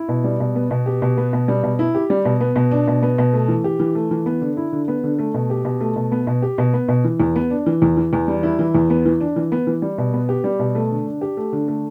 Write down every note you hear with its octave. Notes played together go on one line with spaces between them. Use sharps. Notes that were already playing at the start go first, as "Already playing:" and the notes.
Already playing: E4
B2
G3
B2
B3
B2
G4
B2
B3
B2
G3
B2
E4
G4
G3
B2
B3
B2
D4
B2
B3
B2
A3
E3
G4
E3
A3
E3
B3
D3
E4
D3
B3
D3
A3
B2
G4
B2
A3
B2
B3
B2
G4
B2
B3
B2
E3
E2
B3
D4
E3
E2
E3
E2
G3
E4
E3
E2
B3
E3
D4
E3
B3
E3
G3
B2
B3
G4
G3
B2
A3
D3
D4
G4
A3
D3
A3